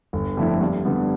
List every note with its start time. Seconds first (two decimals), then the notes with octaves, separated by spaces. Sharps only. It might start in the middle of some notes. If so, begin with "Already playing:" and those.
0.13 G1
0.37 F2 D3 A3 E4
0.61 G2
0.85 D3 G3 B3